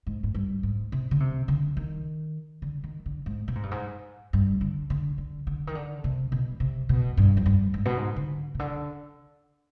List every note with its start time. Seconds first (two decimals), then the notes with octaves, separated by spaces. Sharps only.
0.07 G#2
0.23 G#2
0.34 G2
0.63 G#2
0.92 C3
1.11 D3
1.20 C3
1.48 D3
1.77 D#3
2.62 D3
2.84 D#3
3.06 D3
3.26 G#2
3.48 B2
3.55 G#2
3.63 G2
3.71 G#2
4.33 G2
4.61 D3
4.90 D3
5.18 D3
5.47 D3
5.67 D#3
5.75 D3
6.04 C3
6.32 B2
6.60 C3
6.89 B2
7.17 G2
7.37 F2
7.46 G2
7.74 G#2
7.85 B2
7.97 G#2
8.16 D3
8.55 C3
8.59 D3